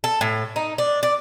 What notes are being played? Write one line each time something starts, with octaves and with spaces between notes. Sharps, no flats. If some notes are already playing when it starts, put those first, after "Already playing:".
A4
A2
D#4
D4
D5